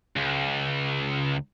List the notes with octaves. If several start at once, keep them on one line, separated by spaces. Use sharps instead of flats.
C#2